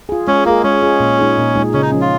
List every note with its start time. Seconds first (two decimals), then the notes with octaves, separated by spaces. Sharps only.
0.09 F4 G#4
0.27 G#3 C#4
0.46 A#3 F4 G#4
0.63 G#3 C#4
0.82 F4 G#4
1.00 A#2
1.19 G#3 D#4 G#4
1.37 A#2
1.55 G#3 D#4 G#4
1.74 C#3 C#4
1.82 D#4
1.92 F3 C#4
2.01 F4